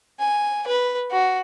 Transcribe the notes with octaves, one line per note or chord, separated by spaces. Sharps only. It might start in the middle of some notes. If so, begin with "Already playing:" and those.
G#5
B4
F#4